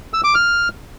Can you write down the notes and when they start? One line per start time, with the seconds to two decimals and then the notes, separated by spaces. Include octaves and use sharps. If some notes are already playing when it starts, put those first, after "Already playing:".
0.13 E6
0.24 D6
0.35 F6